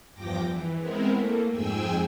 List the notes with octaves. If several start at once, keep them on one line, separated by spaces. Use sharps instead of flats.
E2 G2 F3 G5 D6 A#6
E3
G#3 B3 C4 E4 A#4
A3 A#3
F2 G#2 G#4 G5 G#5 E6